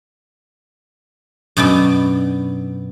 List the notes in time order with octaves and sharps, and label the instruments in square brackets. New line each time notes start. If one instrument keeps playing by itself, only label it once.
[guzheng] F#2 B2 B3 D4